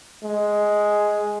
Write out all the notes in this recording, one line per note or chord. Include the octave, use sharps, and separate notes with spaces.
G#3